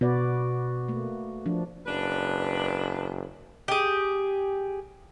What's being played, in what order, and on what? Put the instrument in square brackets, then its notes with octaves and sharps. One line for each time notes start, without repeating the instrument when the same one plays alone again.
[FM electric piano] B2 [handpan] F#4 B4 D5
[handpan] A3 A#3
F3 D4
[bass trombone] F#1 [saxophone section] D4 B4
[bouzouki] G4 G#4